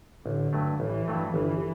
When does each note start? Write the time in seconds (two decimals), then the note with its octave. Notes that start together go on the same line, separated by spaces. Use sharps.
0.25 A1 D3
0.53 G2 F#3 A3
0.80 A1 E3
1.08 G2 F#3 A3
1.34 G1 E3